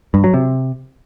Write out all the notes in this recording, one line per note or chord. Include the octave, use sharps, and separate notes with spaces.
G2
F#3
C3